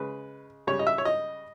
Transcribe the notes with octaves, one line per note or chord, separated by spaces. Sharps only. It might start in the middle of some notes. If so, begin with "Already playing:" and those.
Already playing: C#3 G#3 B4
C#3 G3 C#5
D#5
E5
C#5
D#5